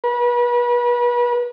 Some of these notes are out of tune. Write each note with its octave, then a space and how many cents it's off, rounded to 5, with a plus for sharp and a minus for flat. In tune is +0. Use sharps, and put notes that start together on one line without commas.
B4 -35